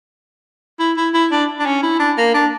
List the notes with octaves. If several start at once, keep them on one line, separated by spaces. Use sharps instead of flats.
E4
E4
E4
D4
D4
C#4
E4
D4
A#3
D4